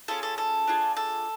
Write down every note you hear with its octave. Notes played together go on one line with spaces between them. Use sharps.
C#4 F4 G#4 A4
A4
A4
D4 F4 G#4
A4